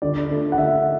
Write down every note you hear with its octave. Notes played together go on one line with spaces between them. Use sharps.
D3 D5
A3 D4
F#5
D3 E5